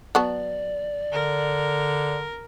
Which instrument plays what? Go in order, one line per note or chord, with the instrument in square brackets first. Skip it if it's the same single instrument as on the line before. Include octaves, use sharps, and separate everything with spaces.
[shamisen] F#3 B3 A5 [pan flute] D5
[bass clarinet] D3 [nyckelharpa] A#4